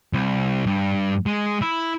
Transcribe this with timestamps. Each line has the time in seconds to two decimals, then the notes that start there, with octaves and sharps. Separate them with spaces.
0.13 C2
0.67 G2
1.26 G#3
1.62 E4